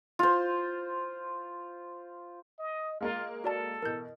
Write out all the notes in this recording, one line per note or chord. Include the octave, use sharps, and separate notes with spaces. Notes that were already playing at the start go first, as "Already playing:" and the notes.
F4 C5
D#5
G#3 A#3 F4 A#4
F#4 A4 D5 A5
B2 E3 A#4 G6